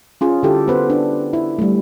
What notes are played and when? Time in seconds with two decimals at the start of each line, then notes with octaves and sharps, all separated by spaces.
0.21 C#4 F4 G#4
0.43 D3 E4 G4 A4
0.68 B3 B4 C5
0.90 D4
1.33 E4
1.59 G3 A3